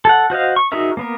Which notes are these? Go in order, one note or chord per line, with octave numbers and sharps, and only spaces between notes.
A4 F#5
F#4 C5 D#5 F5
C#6
D#4 F#4 G#4 A#4 E5
A#3 B3 A#4